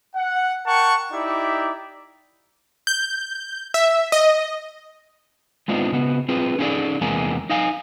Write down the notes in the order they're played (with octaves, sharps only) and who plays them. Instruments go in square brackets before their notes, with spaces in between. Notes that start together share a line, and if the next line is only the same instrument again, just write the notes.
[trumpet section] F#5
A#4 F#5 G5 A5 C#6
D#4 E4 G4 D5 E5
[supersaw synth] G6
E5
D#5
[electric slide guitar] G#3 B3 C4 D4 D#4 F4
C#3 B3 F#4
C4 F4 G#4 B4
C#4 D#4 G#4 A4 D5
E2 C3 G#3 A#3 G#5 A#5
D#4 D#5 F5 G#5